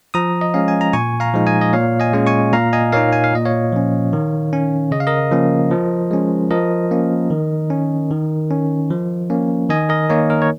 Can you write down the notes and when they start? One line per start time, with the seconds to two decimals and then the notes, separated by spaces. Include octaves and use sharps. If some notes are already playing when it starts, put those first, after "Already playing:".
0.14 F3 A#5 D#6
0.41 D#5
0.54 G#3 C#4 F5
0.68 G#5
0.81 A#5
0.93 A#2 G#5 C#6
1.20 F5 A#5
1.34 F3 G#3 D#4
1.46 D#5 G#5
1.61 D#5
1.73 A#2 C#5 F5
2.00 D#5 G#5
2.13 G#3 C#4
2.27 G#5 C#6
2.53 A#2 F5 A#5
2.73 D#5 G#5
2.92 A#3 D#4 C#5 F5
3.13 G#5
3.24 F5
3.32 A#2 D#5
3.45 C#5 F5
3.72 F3 C#4
4.13 D#3
4.53 C#4
4.91 C#3 D#5
5.00 F5
5.07 A#4 D#5
5.31 F3 A#3 C#4
5.71 F3
6.11 G#3 C#4
6.51 F3 A#4 D#5
6.91 A#3 C#4
7.30 D#3
7.70 C#4
8.11 D#3
8.51 C#4
8.90 F3
9.30 A#3 C#4
9.70 D#3 D#5 G#5
9.89 A#4 D#5
10.10 A#3 D#4 C#5
10.30 A#4
10.42 C#5